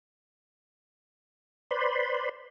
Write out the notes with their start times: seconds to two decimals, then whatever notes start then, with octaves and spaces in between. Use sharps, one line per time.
1.71 B4 C5 D5 B5 C6